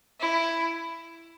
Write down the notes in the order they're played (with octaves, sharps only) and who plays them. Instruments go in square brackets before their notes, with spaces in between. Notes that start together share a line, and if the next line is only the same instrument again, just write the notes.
[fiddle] E4